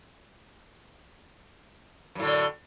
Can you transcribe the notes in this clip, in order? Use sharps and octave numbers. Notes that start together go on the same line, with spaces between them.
F#2 A2 D3